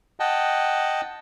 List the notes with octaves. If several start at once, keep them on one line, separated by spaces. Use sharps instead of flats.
D#5 F#5 G5 A5